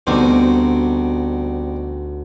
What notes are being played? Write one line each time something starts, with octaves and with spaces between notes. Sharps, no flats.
D2 B2 G3 C4 D#4 D6